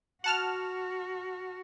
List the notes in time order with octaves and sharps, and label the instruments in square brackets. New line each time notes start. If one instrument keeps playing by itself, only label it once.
[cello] F#4 [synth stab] F#5 A5 F6